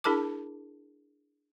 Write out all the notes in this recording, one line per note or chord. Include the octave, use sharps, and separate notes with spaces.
D4 E4 G#4 A#4 A5 D6